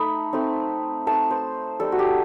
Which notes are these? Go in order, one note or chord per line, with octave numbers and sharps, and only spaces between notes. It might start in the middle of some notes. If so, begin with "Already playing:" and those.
Already playing: A3 D#4 B5
A3 C4 D#4
A3 D#4 A5
C5
G3 D#4 A4
F#4
G4